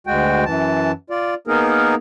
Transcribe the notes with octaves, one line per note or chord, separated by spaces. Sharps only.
D2 G#3 F#4 G5
F#2 E3 A5
F4 D5
A#3 B3 D#4 G#4 A#4